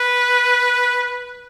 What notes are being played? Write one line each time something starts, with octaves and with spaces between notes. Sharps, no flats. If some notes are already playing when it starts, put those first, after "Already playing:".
Already playing: B4